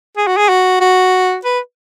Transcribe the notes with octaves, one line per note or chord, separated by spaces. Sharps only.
G#4
F#4
G#4
F#4
F#4
B4